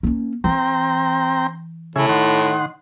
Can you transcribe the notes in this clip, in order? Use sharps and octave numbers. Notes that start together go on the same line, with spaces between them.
A#3 C#4
E3 C4 G5 A#5
A2 C#3 G#4 E5
D#3 F#5 C6